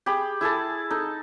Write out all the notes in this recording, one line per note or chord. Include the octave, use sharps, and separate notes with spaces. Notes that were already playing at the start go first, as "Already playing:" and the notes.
G4 G#4 B5
E4 G#4 A4 A5
D#4 A4